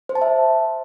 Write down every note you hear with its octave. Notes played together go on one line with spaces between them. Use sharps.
C5
A5
E5